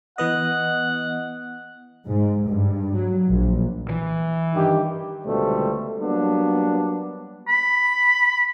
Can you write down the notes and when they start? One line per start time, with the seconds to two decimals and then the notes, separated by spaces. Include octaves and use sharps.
0.18 E3 B3 D#5 F#5
2.06 G#2
2.47 G2
2.95 F#3
3.29 A#1
3.90 E3
4.54 G2 D#3 G4
5.25 C#2 B2 D3 G3 A3 C5
6.01 F#3 G3 A#3 B3 D4
7.48 B5